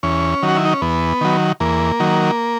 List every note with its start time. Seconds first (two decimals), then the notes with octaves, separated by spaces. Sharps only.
0.03 E2 C#4
0.43 D#3 F#3
0.48 F#4
0.57 E4
0.65 D#4
0.73 C#4
0.82 E2 B3
1.21 D#3 F#3
1.60 E2 A#3
2.00 D#3 F#3